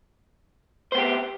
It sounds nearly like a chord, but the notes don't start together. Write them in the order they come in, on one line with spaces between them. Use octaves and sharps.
C5 B3 G4